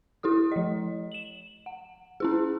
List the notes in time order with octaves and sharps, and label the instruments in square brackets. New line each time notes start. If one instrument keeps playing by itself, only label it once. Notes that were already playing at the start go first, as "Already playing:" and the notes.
[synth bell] E4 G4 A4 D#6
F3 D#5
E7 F#7
F#5
C#4 E4 G#4